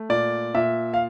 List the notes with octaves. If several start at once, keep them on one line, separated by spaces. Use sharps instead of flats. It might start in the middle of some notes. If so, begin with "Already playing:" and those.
Already playing: A3
A#2 D5
A#2 E5
F5